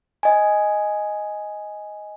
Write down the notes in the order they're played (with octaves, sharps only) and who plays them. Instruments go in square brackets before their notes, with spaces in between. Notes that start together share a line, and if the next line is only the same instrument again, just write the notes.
[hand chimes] D#5 G#5